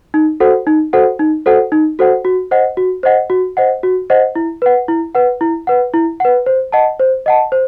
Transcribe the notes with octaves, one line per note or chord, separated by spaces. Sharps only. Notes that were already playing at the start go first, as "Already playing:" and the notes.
D#4
F#4 A4 C5 F#5
D#4
F#4 A4 C5 F#5
D#4
F#4 A4 C5 F#5
D#4
F#4 A4 C5 F#5
F#4
C5 D#5 F#5
F#4
C5 D#5 F#5
F#4
C5 D#5 F#5
F#4
C5 D#5 F#5
E4
B4 F#5
E4
B4 F#5
E4
B4 F#5
E4
B4 F#5
C5
D#5 F#5 A5
C5
D#5 F#5 A5
C5